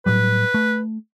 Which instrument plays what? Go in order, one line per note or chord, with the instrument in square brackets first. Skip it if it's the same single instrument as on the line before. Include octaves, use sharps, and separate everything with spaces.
[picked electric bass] A2 F#3 G3 [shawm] B4
[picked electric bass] A3